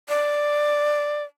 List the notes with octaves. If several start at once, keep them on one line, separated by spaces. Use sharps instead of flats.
D5